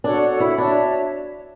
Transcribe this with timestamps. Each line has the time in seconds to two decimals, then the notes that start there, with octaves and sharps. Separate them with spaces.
0.04 D4 F#4 A4 C#5 F#5
0.40 E4
0.57 D4 F#4 C#5 E5 A5